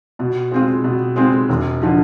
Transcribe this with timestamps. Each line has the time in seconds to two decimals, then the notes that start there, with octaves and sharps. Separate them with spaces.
0.19 B2
0.52 G#3 C4 F4 G#4
0.84 B2
1.16 G#3 C4 F4 G#4
1.49 E1
1.81 D3 F3